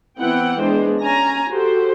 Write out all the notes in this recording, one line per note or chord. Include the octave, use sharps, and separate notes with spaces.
E3 B3 C4 E4 F#5 G5
G#3 B3 D4 C5
C#4 G#5 A#5
F#4 G4 A4 C5